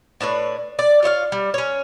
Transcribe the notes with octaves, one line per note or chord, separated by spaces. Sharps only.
A2 D4 B4 C#5
D5
F4 C#5 E5 F5
G3
C#4 C#5